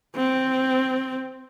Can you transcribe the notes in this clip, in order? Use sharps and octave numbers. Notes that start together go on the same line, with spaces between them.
C4